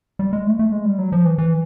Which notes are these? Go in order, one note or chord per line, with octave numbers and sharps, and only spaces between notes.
G3
G#3
A3
A3
G#3
G3
F#3
F3
E3
E3